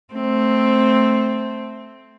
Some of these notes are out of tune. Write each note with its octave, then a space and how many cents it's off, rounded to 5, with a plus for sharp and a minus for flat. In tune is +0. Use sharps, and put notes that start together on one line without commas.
A3 +0 C4 +0